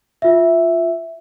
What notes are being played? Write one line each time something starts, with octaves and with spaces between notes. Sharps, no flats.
F4 E5